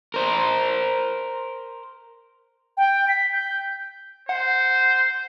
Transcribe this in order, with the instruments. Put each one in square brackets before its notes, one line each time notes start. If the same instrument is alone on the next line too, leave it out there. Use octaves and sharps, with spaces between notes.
[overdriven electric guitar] A#4 C5
[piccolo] G5
B6
G6
[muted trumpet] C5 [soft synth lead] F#5